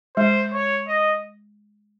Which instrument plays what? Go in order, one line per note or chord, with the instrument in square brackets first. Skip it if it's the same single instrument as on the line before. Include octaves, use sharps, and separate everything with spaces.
[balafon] G#3 [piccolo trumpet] C5
[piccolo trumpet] C#5
D#5